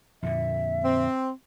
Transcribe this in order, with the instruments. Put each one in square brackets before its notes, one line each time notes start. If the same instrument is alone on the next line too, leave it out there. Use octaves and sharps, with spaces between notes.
[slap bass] F2 A#2 D3 [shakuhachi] E5
[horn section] C4